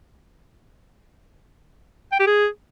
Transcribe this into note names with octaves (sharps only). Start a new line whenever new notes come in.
G5
G4
G#4